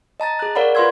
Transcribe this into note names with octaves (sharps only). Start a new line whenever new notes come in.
D#5 A5 A#5 A6
G#4 F#6
A#4 C#5 D5 F5 F#5 B5
F4 B4 F5 C6 E6 G#6